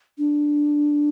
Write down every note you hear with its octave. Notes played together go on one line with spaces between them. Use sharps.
D4